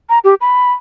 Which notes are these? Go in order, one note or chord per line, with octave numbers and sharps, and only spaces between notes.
A#5
G4
B5